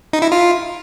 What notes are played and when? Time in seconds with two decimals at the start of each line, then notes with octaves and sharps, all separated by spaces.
0.13 D#4
0.22 E4
0.32 F4